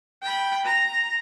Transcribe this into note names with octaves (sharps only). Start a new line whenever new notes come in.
G5 B5
A#5